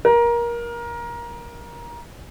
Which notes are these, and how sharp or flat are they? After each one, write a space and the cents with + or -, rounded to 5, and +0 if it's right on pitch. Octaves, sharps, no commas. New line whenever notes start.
A#4 +20